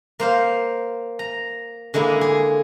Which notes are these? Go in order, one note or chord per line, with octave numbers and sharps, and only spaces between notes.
A#3 C5 F5
A#5
D3 G#3 A#3 E4
G#4